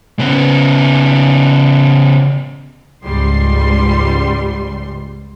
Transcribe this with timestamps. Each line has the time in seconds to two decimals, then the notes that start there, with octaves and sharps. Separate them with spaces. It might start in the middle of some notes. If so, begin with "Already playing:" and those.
0.19 C#3 B3
3.04 C#2 G#2 G3 C6